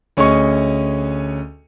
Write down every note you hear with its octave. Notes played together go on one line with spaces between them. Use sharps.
D2 C#4 G#4 D#5 C#6